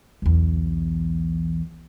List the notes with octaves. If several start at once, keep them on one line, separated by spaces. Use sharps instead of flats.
B1 E2